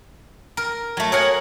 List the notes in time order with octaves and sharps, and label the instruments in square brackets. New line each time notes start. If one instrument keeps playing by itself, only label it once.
[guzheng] A#4
F#3 A3
[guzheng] G#4 A#4 F#5 [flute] C#5